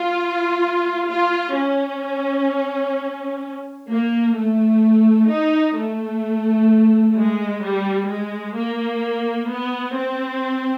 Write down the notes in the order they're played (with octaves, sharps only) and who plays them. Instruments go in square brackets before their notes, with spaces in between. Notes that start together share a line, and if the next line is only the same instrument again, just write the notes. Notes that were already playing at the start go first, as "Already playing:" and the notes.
Already playing: [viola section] F4
F4
C#4
A#3
A3
D#4
A3
G#3
G3
G#3
A#3
B3
C4